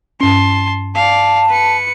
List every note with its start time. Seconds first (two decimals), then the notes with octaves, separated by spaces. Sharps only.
0.20 G2 C#4 A5 C6
0.95 D5 F5 A5
1.49 B4 C#7